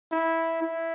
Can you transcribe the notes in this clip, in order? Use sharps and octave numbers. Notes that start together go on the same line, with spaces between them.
E4
E4